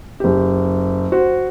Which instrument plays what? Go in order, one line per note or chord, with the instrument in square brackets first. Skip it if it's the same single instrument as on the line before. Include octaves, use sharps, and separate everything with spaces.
[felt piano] F#1 G4
F#4 C5